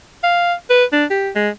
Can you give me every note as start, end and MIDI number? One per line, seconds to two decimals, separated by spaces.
0.23 0.53 77
0.70 0.85 71
0.92 1.05 62
1.11 1.30 67
1.35 1.49 56